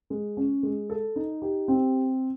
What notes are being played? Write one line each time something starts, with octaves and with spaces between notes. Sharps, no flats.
G#3
C#4
G#3
A4
D#4
G4
C4